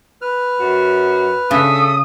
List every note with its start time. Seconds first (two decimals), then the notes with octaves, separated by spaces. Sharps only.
0.21 B4 F6
0.59 F#2 F#4
1.51 C#3 D4 A4 E5 D#6